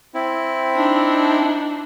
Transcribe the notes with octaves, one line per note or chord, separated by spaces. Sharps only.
C4 E4
D4 D#4